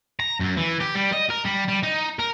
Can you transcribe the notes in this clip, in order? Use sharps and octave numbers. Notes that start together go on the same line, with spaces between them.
A#5
F#2
E3
G4
G3
D#5
A#4
G3
G3
D#4
A#4